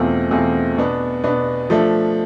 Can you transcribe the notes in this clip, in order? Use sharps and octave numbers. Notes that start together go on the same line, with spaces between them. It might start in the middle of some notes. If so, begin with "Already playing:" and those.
Already playing: E2 B2 A3 C4 F4
E2 B2 A3 C4 F4
B2 B3 D4
B2 B3 D4
F3 A3 D4